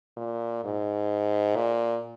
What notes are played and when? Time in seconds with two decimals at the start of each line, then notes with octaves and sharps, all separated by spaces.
0.17 A#2
0.64 G#2
1.56 A#2